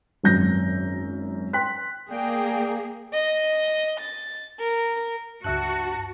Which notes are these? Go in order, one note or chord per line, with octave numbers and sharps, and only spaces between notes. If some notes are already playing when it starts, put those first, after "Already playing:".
G#1 F#2 G6 A#6
G5 C6 F#6 B6
A#3 G#4 D5 G5
D#5
A6
A#4
C#2 G2 F#4 E5 A5 F#6